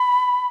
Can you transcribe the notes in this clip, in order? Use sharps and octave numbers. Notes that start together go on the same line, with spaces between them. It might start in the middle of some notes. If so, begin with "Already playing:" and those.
Already playing: B5